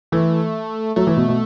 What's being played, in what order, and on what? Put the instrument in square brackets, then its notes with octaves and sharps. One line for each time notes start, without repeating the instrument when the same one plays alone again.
[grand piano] E3 [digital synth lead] A3
[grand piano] F#3 [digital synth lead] A3
[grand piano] E3
B2
B2